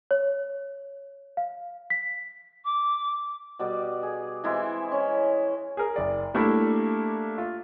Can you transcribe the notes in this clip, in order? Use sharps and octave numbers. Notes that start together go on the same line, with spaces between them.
C#5
F5
B6
D6
B2 G3 D5
G#4
E3 G#3 C4 E4
C#4
G#4 A#4
F#1 D5
G3 A3 A#3 D4 E4 A4
F4